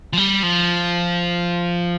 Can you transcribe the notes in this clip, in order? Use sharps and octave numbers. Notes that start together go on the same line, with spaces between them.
F3
G3
F3